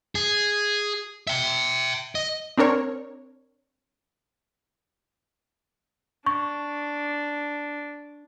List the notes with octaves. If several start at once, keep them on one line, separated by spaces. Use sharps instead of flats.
G#4
E5 G5
D#5
C4 D4 A#4 C#5
D4 C#6